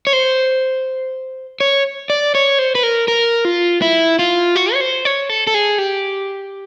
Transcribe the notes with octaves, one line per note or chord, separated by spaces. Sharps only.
C#5
C5
C#5
D5
C#5
C5
B4
A#4
A#4
F4
E4
F4
F#4
C#5
C5
C#5
A4
A4
G#4
G4